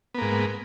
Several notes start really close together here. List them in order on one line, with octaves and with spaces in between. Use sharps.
B3 A#3 G#2